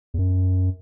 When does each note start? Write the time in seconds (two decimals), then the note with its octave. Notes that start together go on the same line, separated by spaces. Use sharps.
0.14 E2
0.18 F#2